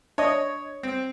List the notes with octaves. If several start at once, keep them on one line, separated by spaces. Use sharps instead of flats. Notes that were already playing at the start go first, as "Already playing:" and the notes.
D4 C#5 D#5
C4